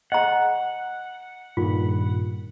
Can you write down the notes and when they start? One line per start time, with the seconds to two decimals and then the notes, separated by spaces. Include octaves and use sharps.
0.12 D#5 F#5 A#5
1.57 G2 A#2 D#3 F4